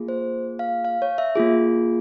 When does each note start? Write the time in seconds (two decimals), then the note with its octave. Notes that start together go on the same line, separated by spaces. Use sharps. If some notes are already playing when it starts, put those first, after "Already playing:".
Already playing: A#3 F4 G#4
0.08 C5
0.59 F5
0.85 F5
1.02 C#5
1.18 E5
1.36 A#3 F4 G#4